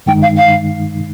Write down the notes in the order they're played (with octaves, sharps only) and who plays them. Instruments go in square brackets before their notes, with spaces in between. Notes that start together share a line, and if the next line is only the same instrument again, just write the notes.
[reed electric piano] G2 D#3 G#3 D#4 [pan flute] G5
[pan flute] F5
F5